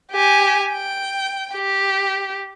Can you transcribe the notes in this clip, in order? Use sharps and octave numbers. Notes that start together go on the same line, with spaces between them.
G4 G#5
G5
G4